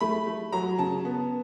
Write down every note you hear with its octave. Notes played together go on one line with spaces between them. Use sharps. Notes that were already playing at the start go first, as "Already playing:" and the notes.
A3 B5
A3
F#3 A#5
C#3 A5
B3